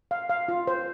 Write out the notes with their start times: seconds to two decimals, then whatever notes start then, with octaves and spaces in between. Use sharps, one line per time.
0.11 F5
0.29 F5
0.48 F4
0.67 C5